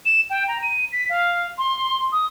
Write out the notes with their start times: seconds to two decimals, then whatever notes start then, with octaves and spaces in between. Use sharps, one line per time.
0.06 E7
0.30 G5
0.48 A#5
0.63 D#7
0.92 B6
1.09 F5
1.58 C6
2.12 D#6